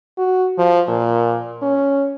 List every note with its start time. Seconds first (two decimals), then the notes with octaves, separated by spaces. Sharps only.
0.18 F#4
0.59 F3
0.88 A#2
1.62 C#4